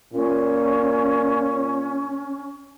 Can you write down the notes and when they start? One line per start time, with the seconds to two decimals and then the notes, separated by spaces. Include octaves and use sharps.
0.13 A#2 C#4